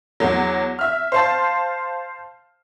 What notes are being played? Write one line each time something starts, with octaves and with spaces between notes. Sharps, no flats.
E2 F#3
E5 F6
C5 F5 A5